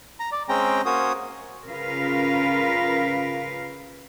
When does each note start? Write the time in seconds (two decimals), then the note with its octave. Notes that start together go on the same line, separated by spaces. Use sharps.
0.20 A#5
0.32 D5
0.49 G#3 C4 C#4 G5 A#5
0.85 A#3 C#4 F#4 C5 C#5 D#6
1.68 C#3 F4 A#4 B4 F5